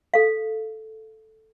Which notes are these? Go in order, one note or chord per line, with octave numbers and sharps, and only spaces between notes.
A4 F5